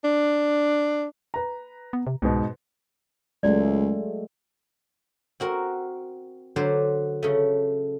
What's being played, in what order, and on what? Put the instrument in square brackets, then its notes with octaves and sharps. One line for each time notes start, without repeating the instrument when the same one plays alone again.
[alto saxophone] D4
[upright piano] B4 A#5
[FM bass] B3
C3
[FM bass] C2 [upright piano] G#2 B2
[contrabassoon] C#2 [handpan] F#3 G#3 A3 [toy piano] D5
[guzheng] C4 F#4 A#4
D3 F#3 B4 C5 D5
C#3 A3